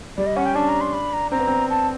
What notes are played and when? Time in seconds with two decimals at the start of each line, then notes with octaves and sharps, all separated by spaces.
0.18 G3 D5
0.26 D#5
0.36 C#4 F#5
0.46 G5
0.55 D4 A5
0.69 A#5
0.81 C6
0.93 B5
1.13 A#5
1.31 C4 A#5
1.40 B3
1.47 C4
1.70 A5